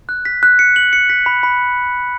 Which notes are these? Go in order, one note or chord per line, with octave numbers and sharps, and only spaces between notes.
F#6
B6
F#6
C#7
F#7
C#7
B6
B5
B5